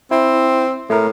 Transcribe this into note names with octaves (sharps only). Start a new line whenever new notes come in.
C4 E4
A2 A3 A#4